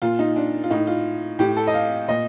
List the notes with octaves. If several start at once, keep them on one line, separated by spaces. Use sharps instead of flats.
A#2 F4
D#4
D4
F4
A2 D#4
F4
A2 G4
A4
D#5
F5
A#2 D#5